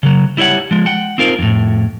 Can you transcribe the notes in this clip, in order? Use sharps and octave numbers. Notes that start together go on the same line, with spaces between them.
C#3 F#3
G3 E4 C5 C#5 F#5
F3 G#3
F#5 G5
C4 D#4 F4 A#4 C5
F2 A2